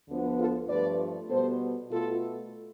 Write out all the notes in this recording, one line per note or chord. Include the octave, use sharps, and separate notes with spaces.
D2 D3 F3 B3
F4 A4
G2 F3 A3 B4 D5
B2 G3 B3 A4 C5
B2 A3 F4 A4